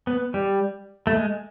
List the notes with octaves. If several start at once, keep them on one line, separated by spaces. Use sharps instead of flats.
B3
G3
A3
G#3